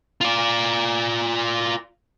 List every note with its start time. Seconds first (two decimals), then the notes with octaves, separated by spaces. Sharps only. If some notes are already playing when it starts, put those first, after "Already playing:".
0.21 F4 D5